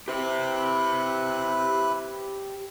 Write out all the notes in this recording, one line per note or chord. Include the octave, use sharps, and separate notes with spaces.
E4 G4 B4 C5 F#6